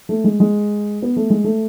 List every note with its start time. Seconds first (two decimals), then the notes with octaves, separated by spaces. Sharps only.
0.09 A3
0.24 G#3
0.40 G#3
1.02 B3
1.16 A3
1.30 G#3
1.44 A3